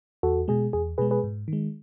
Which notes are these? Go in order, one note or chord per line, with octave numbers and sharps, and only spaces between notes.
E2 F#4 A4
B2 G#3 G#4
E2 G#4
B2 G#3 G#4 B4
G#4 B4
G#2
D#3 G#3